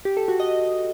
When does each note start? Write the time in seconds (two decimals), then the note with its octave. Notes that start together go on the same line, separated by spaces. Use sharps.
0.05 G4
0.17 A4
0.28 F#4
0.40 D#5